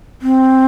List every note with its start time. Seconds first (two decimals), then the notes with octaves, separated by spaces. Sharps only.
0.22 C4